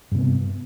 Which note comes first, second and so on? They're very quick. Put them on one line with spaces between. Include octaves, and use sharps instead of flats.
G2 C3 B3